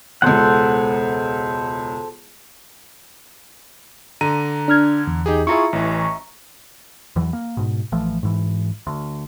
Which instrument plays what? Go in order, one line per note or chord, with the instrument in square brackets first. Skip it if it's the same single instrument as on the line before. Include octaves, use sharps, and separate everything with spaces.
[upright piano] E1 C#2 [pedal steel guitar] A4 C5 F#5
[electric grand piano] D3 A#5 D#7
[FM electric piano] D4 F6 G#6
E2
[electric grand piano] D#4 G4 G#4
[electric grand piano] E4 F4 G#4 [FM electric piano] E5 A#5 C#6
[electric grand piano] A1 E3
[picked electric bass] E2 E3 F#3
A#3
G#2 B2
A1 E3 F3 A3
G#2 E3
D2